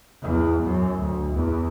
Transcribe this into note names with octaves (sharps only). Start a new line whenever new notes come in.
E2
F#2
D2
E2